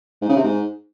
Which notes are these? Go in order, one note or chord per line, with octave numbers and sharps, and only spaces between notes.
G#2
C#3
C3
G#2